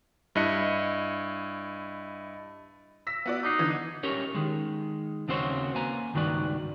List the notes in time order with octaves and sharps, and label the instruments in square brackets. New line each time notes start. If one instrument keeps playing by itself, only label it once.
[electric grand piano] G2 E4 D#5 F#6 C#7
[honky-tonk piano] E6 A#6 B6
B3 F#4 D5
[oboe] D#4 [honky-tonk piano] D6 F#6 C7
[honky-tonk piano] D3 E3
[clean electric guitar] C#4 G4 A#4 C#5
D#3 G#3
D#2 C#3 C4 F#4 C5 C#5
A#3 B4 G#5 A#5
C#2 G2 D#3 F#4 B4 D5